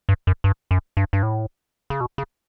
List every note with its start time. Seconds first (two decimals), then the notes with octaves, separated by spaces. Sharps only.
0.09 G2
0.27 F#2
0.44 G2
0.71 F#2
0.97 G2
1.13 G2
1.23 A2
1.90 C#3
2.01 B2
2.18 C#3